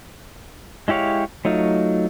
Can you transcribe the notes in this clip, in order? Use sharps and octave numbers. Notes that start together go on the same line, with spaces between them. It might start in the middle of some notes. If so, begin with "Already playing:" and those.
G#3 E4 G4 C#5 F5
F#3 A3 D#4 F4